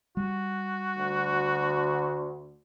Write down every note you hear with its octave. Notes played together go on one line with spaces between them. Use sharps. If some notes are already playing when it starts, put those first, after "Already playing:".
G3 F#4
D2